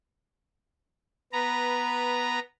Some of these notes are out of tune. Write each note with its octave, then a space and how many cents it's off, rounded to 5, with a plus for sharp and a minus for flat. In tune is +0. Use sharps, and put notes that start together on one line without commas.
B3 +0 B4 -10 A#5 +0